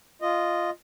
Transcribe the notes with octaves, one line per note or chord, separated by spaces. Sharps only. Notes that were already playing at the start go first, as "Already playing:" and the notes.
F4 D#5